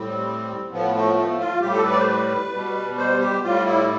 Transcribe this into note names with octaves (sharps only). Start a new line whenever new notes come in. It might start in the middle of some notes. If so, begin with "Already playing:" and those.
Already playing: A2 G3 C4
A2 F3 B3
A3
B3
A3
F4
A2 G3 G4
A4
B4
D5
C5
B4
B2 G3
C5
G4
A2 G3 F4
E4